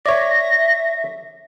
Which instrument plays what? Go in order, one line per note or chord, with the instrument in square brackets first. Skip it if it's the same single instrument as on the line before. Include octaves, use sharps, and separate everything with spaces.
[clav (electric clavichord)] C#5 D5 [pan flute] E5 [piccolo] A#6